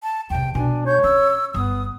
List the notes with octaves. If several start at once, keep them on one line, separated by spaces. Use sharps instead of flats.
A5
E2 C3 G5
B2 D4 G#5
C#5 G6
C#4 E6
G1 B3 D#6